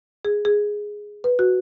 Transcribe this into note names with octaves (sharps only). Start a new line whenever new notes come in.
G#4
G#4
B4
F#4